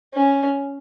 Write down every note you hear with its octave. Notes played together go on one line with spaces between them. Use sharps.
C#4